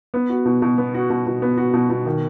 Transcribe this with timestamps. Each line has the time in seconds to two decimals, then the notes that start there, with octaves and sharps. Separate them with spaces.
0.14 B3
0.29 F#4
0.45 B2
0.62 B2
0.78 B3
0.94 F#4
1.10 B2
1.26 B2
1.42 B3
1.57 F#4
1.73 B2
1.90 B2
2.06 D#3